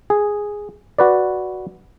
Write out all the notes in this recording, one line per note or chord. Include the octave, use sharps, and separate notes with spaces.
G#4
F#4 B4 D5